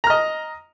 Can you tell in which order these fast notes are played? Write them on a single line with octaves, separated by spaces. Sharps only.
A#5 F6 D#5